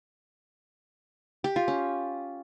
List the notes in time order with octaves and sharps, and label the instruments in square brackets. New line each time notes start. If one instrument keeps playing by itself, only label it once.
[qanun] G4
F4
C#4